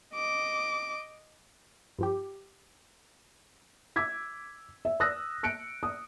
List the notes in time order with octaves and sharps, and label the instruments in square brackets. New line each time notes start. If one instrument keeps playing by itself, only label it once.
[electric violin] D#5 D6
[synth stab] G2 F3 G4
[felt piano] D6 E6 G#6 B6
E5
D#6 E6 F#6 A#6
F#6 C#7 D7
D#6